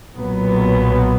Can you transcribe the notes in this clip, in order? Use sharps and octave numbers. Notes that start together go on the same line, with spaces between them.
B1 A#2 F#3 B3